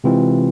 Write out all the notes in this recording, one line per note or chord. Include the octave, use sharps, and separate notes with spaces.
C3 E3 G#3 C4 F4